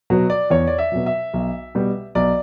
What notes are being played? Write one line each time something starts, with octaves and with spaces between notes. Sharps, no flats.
B2 F#3
D5
E2 C#5
D5
E5
B2 F#3
E5
B1
B2 G3
B1 D5